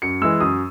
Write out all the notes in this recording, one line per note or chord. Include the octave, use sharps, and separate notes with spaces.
F#2 C#7
E3 G#3 E6
F#2 D#6